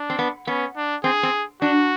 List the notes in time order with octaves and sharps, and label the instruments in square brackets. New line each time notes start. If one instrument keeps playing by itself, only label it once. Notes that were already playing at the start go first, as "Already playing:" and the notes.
Already playing: [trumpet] D4
[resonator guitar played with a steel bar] C4
B3
[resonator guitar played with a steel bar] B3 [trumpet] C#4
[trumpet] D4
[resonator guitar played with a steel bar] C4 [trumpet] G#4
[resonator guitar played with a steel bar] C4
[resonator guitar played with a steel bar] D4 [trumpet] F#4